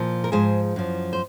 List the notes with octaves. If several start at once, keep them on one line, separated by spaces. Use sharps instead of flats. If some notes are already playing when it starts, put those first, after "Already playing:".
Already playing: A#2 F3
A#4
G#2 F3 G#4 C5
F#2 F3
C5